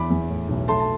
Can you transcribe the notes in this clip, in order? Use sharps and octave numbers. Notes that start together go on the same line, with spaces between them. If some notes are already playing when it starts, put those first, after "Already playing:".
Already playing: E2 B5 D6
E2
A2
B1
A3 A5 C6
A5